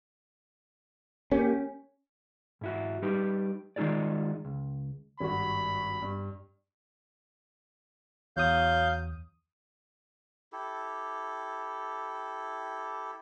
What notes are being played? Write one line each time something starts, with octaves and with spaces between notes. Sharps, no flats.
A#3 C#4 G4
G#2 E4 F#4
G3 D#4 G4 B4
D#3 G#3 D#4 F4 G#4 D5
C#2
G#1 G2 F#4 B5
G2
E2 F#3 F5 D#6 G6
E4 G4 A4